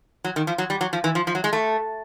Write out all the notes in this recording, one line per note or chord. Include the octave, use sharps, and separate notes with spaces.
F#3
D#3
F3
F#3
G3
F#3
F3
E3
F3
F3
F#3
G#3
A3